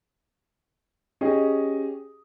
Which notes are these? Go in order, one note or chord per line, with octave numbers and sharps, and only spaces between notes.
C#4 G4 G#4 D#5